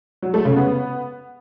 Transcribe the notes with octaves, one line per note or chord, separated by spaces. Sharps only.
F#3
A3
C#3
B3